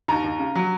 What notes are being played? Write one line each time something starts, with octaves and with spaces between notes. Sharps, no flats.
D#2 A#5
D#2
C#3
F#3